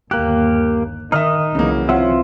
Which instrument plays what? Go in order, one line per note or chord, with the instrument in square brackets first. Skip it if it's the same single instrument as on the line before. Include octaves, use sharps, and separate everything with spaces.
[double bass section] G1 D#2 [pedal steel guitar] A#3 G4 [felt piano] F#6
[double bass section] D#3 [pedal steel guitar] D#4 D#5 D#6 [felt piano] E5 F6
[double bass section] C2 E3 F#3 [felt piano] C#3 A#3
[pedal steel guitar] C4 F4 E5 [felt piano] C#4 F#5